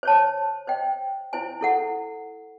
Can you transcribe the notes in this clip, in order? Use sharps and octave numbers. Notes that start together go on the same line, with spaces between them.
C5 C#5 A5
C5 D#5 G5
E4 C5 G#5
E4 A4 F#5